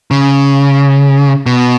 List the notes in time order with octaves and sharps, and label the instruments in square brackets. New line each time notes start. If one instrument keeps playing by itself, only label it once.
[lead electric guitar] C#3
B2